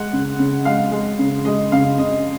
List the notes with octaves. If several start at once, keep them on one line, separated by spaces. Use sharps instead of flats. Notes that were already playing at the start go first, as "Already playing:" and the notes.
Already playing: G#3 F#5
C#3
C#3
G#3 F5
G#3
C#3
G#3 D#5
C#3 F5
C#3 D#5